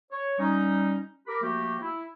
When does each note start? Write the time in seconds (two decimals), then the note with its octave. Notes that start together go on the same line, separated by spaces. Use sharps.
0.11 C#5
0.39 G3 C#4 D#4
1.27 G4 A#4 B5 D6
1.42 F3 A3 A#3 F#4 G4
1.81 E4